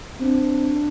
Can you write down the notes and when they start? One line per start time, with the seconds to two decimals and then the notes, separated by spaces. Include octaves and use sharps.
0.21 C4 D4